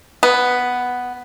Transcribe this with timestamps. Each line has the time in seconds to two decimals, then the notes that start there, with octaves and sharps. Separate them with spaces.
0.23 B3